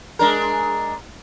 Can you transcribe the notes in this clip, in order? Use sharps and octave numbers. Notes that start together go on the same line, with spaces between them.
G#3 D4 A#4